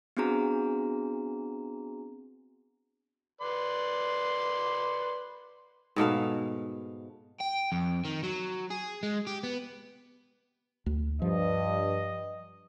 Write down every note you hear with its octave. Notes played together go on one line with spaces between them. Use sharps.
B3 C4 D4 F#4 G#4 A#5
B4 D5 C6
G#2 B2 A3 F5
G5
F2
D#3
F#3
G#4
G#3
G4
B3
D2
G2 F3 D#5